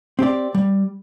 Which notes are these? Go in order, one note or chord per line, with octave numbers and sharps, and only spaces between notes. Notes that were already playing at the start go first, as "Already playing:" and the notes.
C4 G4 D5
G3